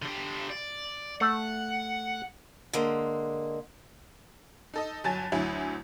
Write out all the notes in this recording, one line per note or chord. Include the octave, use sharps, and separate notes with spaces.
D3 G4
D5
A3 F#5
D3 G#3 A#3
D#4 A4 D#5
G1 F#3 G#5 A5 A6
D2 F#3 E4 G#5